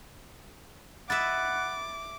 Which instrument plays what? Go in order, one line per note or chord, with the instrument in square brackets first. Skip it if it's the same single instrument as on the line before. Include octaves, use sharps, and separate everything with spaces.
[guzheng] E4 D#5 E5 [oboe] F#5 [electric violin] D6 [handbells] A6